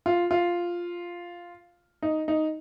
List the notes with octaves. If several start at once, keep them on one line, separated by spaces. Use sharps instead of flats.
F4
F4
D#4
D#4